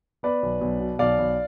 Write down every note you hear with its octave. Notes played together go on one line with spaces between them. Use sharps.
B3 B4 D5
B1
B1
B2
B1 D5 F5
B1